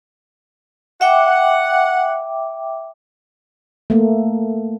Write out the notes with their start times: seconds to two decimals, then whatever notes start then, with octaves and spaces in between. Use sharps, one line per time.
1.01 E5 F#5 G5 D6
3.90 A3 A#3